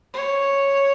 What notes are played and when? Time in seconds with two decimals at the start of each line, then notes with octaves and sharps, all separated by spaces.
0.14 C#5